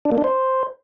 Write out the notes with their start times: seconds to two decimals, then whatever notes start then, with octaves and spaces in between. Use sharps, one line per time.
0.05 D4
0.12 A#3
0.18 D4
0.24 C5